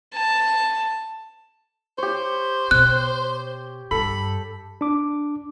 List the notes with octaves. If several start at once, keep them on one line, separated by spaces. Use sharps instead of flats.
A5
G4 C5 C#5
B2 F#6
G2 A4 B5
D4 D6